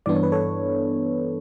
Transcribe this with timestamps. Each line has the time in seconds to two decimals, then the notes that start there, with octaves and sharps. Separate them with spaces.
0.06 G2 E3 B3 D4 D5
0.15 C#5
0.23 B4
0.32 A4 C#5